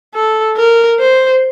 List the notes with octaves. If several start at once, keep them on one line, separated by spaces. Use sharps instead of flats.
A4
A#4
C5